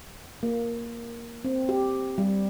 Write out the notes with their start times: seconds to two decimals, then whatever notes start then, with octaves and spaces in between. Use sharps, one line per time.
0.43 A#3
1.45 C4
1.69 G4
2.18 G3